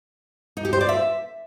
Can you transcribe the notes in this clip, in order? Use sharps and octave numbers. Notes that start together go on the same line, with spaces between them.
D#4
G4
C5
D5
E5